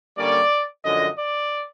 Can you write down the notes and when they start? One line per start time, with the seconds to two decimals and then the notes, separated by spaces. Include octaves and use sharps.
0.16 D3 G3 A#3 C#4 D5
0.83 F#2 D3 F3 G#3 D#5
1.17 D5